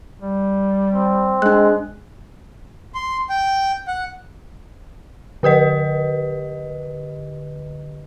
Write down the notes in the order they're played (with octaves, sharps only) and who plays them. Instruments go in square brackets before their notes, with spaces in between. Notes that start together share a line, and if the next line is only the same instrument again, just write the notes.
[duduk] G3
[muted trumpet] C4
[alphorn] G#3 [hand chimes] D4 F#6
[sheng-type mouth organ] C6
G5
F#5
[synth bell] D3 G4 B4 D#5